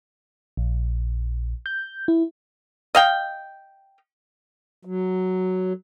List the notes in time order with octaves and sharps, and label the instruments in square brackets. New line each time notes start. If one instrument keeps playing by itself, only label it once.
[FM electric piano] A#1
G6
E4
[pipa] D#5 F5 G5
[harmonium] F#3